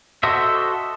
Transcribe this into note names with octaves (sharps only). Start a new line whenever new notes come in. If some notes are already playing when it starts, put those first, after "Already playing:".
F#4 A4 C5 D#5 E5